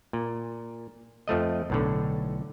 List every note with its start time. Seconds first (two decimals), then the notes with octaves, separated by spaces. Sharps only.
0.13 A#2
1.28 F2 F3 A3 D#5
1.70 B1 A2 D3